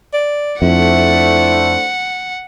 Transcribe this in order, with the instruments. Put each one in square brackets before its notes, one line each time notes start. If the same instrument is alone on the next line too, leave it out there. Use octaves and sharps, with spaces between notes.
[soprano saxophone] D5
[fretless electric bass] F2 [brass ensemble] A3 D4 C5 [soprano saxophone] E4 [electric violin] F#5